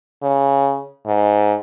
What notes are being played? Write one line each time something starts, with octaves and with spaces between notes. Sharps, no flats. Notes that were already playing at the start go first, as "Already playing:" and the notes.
C#3
G#2